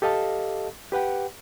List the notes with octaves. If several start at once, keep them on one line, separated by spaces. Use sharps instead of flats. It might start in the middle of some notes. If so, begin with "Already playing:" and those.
G4 A4 D#5 F5 A5
G4 B4 F#5 G5